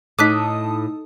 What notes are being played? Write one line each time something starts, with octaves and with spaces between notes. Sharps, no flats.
A2 D#4 A5 D6 D#6 F#6 B6